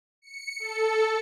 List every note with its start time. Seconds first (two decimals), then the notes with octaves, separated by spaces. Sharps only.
0.22 C#7
0.60 A4